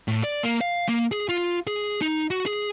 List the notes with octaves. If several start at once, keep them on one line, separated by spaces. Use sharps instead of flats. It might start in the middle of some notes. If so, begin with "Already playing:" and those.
A2
D5
A#3
F5
A#3
G#4
F4
G#4
D#4
F#4
G#4